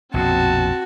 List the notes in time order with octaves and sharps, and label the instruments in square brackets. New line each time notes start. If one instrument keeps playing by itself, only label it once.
[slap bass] A#1 F2 B2 [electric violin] C4 A5 [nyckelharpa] F#4